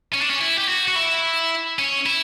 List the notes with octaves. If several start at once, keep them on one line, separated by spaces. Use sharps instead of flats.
C#4
D4
C#4
E4
G4
F#4
F#4
E4
C#4
E4